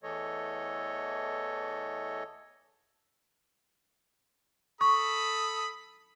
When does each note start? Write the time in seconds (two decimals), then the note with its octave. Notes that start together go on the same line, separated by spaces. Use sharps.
0.03 E2 E3 A3 A4 C#5 D#5
4.81 A4 B5 C#6 D#6